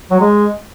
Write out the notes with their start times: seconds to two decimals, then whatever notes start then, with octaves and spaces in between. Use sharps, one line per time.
0.11 F#3
0.20 G#3